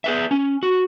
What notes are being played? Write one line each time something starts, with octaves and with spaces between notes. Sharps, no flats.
G#4 B4 E5
C#4
F#4